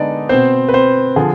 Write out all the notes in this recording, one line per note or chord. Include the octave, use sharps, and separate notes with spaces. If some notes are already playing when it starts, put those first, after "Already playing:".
Already playing: D3 G#3 B3 D4 D#4 D5 D#5
B2 B3 C4 C5
B4
C4 C5
D3 F3 G#4